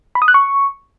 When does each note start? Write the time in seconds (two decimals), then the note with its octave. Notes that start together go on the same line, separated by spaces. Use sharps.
0.15 B5
0.22 D#6
0.28 F#6
0.34 C#6